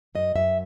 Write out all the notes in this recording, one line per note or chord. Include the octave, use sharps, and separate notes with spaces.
F#2 D#5
F#2 E5